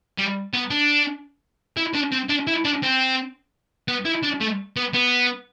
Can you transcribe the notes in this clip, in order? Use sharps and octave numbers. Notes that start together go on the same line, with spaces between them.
G3
B3
D4
E4
D4
C4
D4
E4
D4
C4
B3
E4
D4
A3
B3
B3